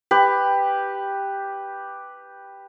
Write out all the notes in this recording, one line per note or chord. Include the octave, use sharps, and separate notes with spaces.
G4 B4